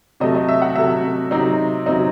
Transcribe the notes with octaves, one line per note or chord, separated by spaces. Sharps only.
C3 F#3 A3 D#5
D#5
E5
F#5
C3 F#3 A3 E5
C3 F#3 C4 D#4
C3 F#3 C4 D#4